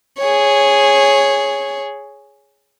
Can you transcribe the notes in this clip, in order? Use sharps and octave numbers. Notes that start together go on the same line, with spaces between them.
G#4 C#5